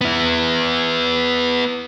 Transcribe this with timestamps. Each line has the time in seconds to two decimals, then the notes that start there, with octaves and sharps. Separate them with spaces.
0.01 B3 E4